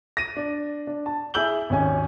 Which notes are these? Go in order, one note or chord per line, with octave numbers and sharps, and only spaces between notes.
A#6 D#7
D4
D4
A5
E4 G#4 E6 G6 F#7 G7
G#1 D#2 C#4 G#5